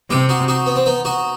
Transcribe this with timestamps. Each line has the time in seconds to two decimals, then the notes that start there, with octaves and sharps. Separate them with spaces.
0.10 C3 E4 G4
0.29 D#4 F#4
0.48 D#4 F#4
0.66 B3
0.76 C4
0.86 B3 D#4
1.05 D#4 F#4